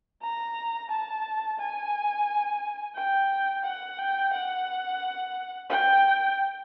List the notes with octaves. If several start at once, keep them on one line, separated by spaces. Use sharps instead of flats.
A#5
A5
G#5
G5
F#5
G5
F#5
G5